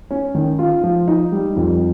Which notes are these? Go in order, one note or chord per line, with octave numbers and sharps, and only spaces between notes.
C#4
D#3
F4
F3
D#4
G3
F2